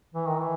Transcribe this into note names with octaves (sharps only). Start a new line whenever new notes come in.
E3
D#3
E3